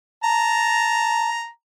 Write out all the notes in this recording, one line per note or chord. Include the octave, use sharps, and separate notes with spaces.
A5 A#5